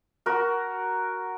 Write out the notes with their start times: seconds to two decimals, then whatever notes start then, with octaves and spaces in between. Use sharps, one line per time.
0.26 F#4 A#4